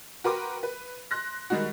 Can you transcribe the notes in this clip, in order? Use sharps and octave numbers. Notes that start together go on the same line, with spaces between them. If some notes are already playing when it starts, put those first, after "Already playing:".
F#4 A#4 B4 G5 C6 D6
B4
C6 F#6 A#6
D#3 G3 G#3 D#4 F#4